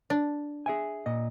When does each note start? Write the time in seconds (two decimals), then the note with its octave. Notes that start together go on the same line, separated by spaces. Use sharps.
0.10 D4
0.66 G#4 E5 G#5
1.06 A#2 D#5